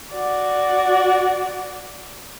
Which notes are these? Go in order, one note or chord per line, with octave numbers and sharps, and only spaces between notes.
F#4 D5